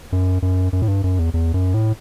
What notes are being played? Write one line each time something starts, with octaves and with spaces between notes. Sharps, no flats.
F#2
F#2
F#2
A2
G2
F#2
E2
E2
F#2
A2